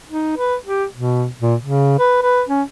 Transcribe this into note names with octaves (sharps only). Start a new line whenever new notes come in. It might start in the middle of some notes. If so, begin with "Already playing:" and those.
D#4
B4
G4
B2
A#2
C#3
B4
B4
C#4